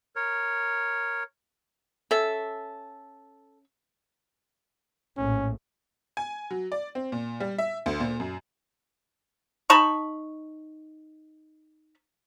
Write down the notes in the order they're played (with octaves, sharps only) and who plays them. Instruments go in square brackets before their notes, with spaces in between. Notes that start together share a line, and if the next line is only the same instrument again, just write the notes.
[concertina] A#4 C#5
[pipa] C#4 E5 [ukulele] A4
[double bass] A#1 A2 [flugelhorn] C#4
[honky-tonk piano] G#5
F#3
D5
C4
A#2
G3
E5
D2
A#2
F#2
[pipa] D#4 A5 B5 C#6